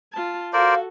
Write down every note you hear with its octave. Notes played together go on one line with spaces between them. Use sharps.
F4 A5
F#4 A4 A#4 C5 D5 F5